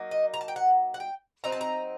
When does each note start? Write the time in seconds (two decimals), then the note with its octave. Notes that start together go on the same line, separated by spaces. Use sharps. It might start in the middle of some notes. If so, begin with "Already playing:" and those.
Already playing: F#3 A#3 D#4
0.11 D#5
0.34 A#5
0.41 A5
0.48 G5
0.56 F#5
0.94 F#5
1.00 G5
1.44 F#3 C4 D#4 A#5
1.52 A5
1.61 A#5